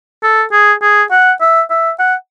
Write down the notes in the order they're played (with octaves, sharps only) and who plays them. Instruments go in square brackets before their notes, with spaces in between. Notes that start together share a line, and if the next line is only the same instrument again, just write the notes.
[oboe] A4
G#4
G#4
F#5
E5
E5
F#5